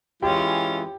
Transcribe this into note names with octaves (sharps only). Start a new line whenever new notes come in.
E3 G#3 C#4 F4 G4 G5